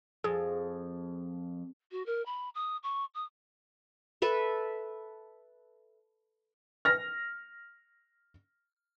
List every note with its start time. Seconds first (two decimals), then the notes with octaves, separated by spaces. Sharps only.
0.24 F2 G#4
1.91 F#4
2.06 A#4
2.25 B5
2.55 D#6
2.83 C#6
3.14 D#6
4.22 A4 B4 E5
6.85 F6 A#6